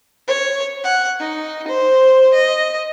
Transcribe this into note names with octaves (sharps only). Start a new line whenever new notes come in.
C#5
F#5
D#4
C5
D#5